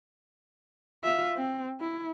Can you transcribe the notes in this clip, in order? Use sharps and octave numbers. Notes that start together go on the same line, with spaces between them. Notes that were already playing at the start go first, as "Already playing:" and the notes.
F4 E5
C4
E4